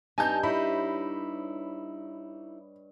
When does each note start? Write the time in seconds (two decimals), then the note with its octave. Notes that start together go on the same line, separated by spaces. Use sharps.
0.18 G2 D#4 D#5 G#5 A5 G6
0.43 D#4 E4 C#5 B5